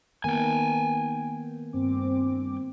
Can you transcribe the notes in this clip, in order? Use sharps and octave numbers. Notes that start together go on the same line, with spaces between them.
D#3 A#3 B3 G5 G#5
G2 C4 D6